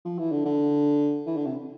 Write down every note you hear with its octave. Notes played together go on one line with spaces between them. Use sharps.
F3
E3
D3
D3
E3
D3
C3